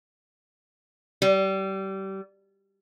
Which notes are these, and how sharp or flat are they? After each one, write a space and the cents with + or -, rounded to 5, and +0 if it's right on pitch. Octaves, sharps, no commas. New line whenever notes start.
G3 -25